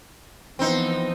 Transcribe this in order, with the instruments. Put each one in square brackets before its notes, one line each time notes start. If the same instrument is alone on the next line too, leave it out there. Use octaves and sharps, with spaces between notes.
[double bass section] E3 F3 B3 [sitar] C4 D#4